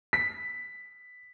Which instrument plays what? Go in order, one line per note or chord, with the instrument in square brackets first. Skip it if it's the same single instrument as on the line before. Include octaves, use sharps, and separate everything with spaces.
[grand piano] B6